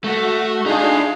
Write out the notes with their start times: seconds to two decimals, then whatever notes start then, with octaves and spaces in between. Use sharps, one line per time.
0.04 A3 F#4
0.66 D4 D#4 F4 G#4